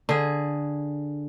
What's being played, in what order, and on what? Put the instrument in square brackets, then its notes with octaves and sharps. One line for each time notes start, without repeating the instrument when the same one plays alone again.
[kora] D3 G#4